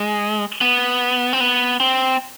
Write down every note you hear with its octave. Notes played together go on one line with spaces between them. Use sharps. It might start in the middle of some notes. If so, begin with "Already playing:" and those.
Already playing: G#3
B3
C4
B3
C4